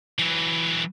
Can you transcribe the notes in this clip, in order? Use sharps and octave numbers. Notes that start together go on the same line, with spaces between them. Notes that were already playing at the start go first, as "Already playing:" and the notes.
E3 F#3